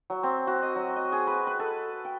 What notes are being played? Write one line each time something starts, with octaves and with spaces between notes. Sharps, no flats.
F#3
C4
F#4
D#5
F#3
D#5
G#4
B4
B4
A4
G5